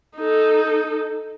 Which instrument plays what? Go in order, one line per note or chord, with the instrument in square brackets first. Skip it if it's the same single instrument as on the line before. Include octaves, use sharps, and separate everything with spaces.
[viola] D#4 A4